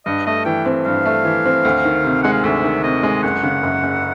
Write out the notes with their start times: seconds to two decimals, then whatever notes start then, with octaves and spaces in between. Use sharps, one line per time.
0.06 G2 D#5
0.27 A3 D#5
0.45 E3 G5
0.66 C4
0.86 G2 F5
1.05 A3
1.25 E3
1.46 C4
1.65 D2
1.85 D#3
2.04 C3
2.23 G#3 F#5
2.33 F5
2.44 D2 E5
2.64 D#3
2.84 C3 D#5
3.03 G#3
3.23 F#1 F#5
3.43 C#3
3.63 F#2
3.83 F#1